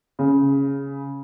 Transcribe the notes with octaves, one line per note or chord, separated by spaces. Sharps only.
C#3